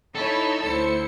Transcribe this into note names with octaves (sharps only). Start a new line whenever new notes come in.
D#4 E4 A4 C#5
D2 E4 C5 C#7